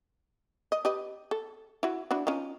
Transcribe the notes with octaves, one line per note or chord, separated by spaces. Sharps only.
D#5
G4 B4 D#5
A4
E4 F#4
D4 E4 F#4
C#4 D#4 F4